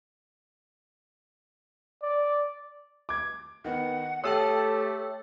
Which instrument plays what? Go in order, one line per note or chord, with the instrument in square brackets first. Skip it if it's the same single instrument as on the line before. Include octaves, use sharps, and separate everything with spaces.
[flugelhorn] D5
[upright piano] D6 G#6
[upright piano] D#3 B3 [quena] F#5
[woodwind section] A3 G4 [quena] A4 [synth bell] C#5 E5 G5 [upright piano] D#6 E6